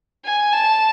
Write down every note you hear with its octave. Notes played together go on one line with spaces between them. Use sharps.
G#5
A5